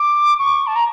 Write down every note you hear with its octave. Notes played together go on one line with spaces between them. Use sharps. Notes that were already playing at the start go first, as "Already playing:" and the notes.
Already playing: D6
C#6
A5
A#5